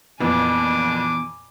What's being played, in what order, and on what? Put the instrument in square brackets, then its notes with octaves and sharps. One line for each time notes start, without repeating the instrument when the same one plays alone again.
[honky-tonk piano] F2 A#2 [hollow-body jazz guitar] E3 B3 [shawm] D4 [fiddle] G#5 D6